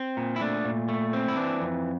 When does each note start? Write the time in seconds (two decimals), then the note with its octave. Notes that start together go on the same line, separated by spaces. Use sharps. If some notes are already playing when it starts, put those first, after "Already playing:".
Already playing: C4
0.17 A#2
0.36 E4
0.41 A3 D4
0.65 A#2
0.89 A3
1.13 C4
1.28 E4
1.36 E3 D4
1.61 F2